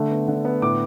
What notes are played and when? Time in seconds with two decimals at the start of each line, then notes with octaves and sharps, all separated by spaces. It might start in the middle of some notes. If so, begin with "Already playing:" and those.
Already playing: D3 A3
0.11 B3
0.28 D3
0.45 B3
0.62 A2 D6